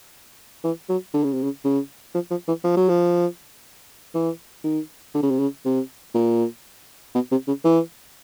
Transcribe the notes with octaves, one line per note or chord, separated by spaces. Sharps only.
E3
F#3
D3
C#3
C3
C#3
C#3
F3
F3
E3
F3
F#3
F3
E3
D#3
D3
C#3
C3
C#3
C3
A#2
B2
C3
C#3
E3